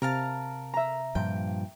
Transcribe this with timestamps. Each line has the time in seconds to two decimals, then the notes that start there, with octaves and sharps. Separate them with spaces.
0.02 C3 A#4 F5 A5
0.74 E5 A#5
1.15 G2 A#2 F3 G5